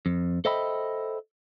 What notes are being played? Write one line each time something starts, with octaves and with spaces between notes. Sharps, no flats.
F2
A4 C5 D#5 E5 G5 B5